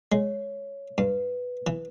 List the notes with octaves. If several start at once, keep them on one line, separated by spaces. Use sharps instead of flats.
G#3 C#5
G2 B4
E3